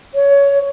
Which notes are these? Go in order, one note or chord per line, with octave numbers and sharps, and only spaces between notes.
C#5